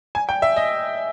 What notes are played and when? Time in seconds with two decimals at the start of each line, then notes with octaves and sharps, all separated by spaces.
0.15 G#5
0.29 G5
0.42 E5
0.56 D#5